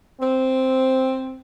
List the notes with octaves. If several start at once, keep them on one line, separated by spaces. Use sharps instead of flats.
C4